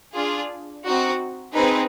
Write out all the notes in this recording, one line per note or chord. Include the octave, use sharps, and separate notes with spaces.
D4 F4 G#4
C4 D#4 F#4
C4 D#4 G#4 B4